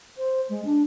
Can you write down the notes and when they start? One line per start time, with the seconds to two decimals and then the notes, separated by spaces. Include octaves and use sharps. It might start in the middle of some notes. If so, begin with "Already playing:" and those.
0.18 C5
0.49 G#3
0.65 D4